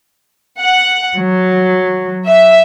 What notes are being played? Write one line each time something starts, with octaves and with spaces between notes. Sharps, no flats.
F#5
F#3
E5